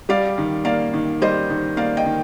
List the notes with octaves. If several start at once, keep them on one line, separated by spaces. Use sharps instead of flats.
G3 D5 F5
D#3
A#3 D5 F5
D#3
G3 C5 D#5
D#3
A#3 D5 F5
D#5 G5
D#3